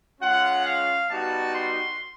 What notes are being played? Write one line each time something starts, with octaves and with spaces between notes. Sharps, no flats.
G#3 C#4 F4 F#5
F5
G3 B3 D#4 F#4 A5
C6